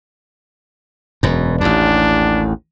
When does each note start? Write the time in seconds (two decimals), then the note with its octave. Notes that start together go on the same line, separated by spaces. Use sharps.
1.23 E1 F#2
1.61 A1 D#2 D4